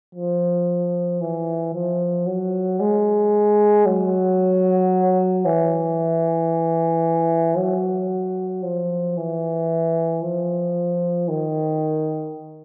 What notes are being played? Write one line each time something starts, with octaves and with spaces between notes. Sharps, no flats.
F3
E3
F3
F#3
G#3
F#3
E3
F#3
F3
E3
F3
D#3